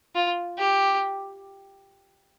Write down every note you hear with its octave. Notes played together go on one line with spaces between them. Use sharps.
F4
G4